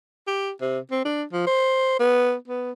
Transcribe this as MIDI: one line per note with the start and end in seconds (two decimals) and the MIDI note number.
0.27 0.51 67
0.61 0.79 48
0.91 1.01 60
1.05 1.24 62
1.33 1.44 53
1.47 1.95 72
2.00 2.35 59
2.48 2.72 59